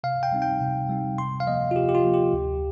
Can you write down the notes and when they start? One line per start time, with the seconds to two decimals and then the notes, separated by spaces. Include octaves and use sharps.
0.04 C3 F5
0.23 G5
0.32 G3 C4 D#4
0.42 G5
0.61 C3
0.89 G3 C4 D#4
1.18 C3 C6
1.40 F5
1.47 F3 A#3 D#5
1.71 F4
1.76 C3 G4
1.89 G4
1.95 F4
2.04 F3 A#3
2.14 G4
2.33 D2